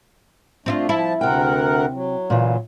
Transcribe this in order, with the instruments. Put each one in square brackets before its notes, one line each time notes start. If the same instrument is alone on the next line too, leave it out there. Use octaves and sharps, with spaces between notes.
[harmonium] A3 D4 [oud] C4 E4 F4
[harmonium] F3 A5 [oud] E4
[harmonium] D2 A#4 F#5 [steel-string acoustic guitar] C3 G5
[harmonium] F#3
[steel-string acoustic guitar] A#2 C#3 E3